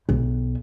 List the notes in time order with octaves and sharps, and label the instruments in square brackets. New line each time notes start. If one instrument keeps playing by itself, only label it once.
[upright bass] B1